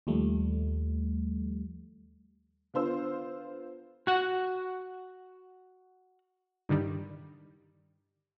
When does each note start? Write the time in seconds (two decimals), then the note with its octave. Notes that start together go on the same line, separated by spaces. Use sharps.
0.07 D#2 F3 G3 A3
2.74 D3 B3 F4 C5 E6
4.07 F#4 F#5
6.69 G2 D3 D#3 G3